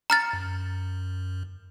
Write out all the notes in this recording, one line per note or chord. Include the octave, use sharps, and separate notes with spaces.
A#5 F6 A6 C#7
F#2